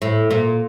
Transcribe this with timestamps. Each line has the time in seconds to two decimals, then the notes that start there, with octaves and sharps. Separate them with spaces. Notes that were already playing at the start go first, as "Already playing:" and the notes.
0.02 A2
0.31 A#2